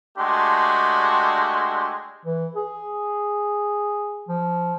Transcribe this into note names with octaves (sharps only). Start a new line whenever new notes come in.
G#3 A3 D4 F#4 G4 C6
E3
G#4
F3